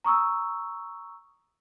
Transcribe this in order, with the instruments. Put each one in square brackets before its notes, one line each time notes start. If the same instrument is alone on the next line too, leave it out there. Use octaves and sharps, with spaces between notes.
[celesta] A#5 C#6 D#6 E6